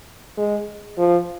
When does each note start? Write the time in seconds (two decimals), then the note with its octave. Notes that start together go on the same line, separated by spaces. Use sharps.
0.37 G#3
0.98 F3